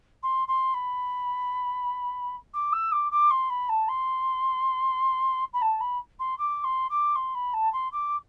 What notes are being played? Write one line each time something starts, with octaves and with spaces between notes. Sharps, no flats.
C6
C6
B5
D6
E6
D6
D6
C6
B5
A5
C6
B5
A5
B5
C6
D6
C6
D6
C6
B5
A5
C6
D6